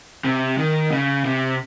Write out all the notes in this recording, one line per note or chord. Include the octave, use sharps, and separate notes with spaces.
C3
D#3
C#3
C3